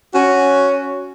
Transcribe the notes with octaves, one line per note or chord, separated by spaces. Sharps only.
C#4 F#4